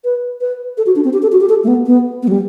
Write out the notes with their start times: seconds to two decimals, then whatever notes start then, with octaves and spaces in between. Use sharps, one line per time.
0.05 B4
0.41 B4
0.77 A4
0.86 F#4
0.96 D4
1.04 C4
1.13 G4
1.22 A4
1.32 F#4
1.41 G4
1.49 A4
1.64 A3
1.68 B3
1.86 B3
2.23 B3
2.28 F#3
2.31 G3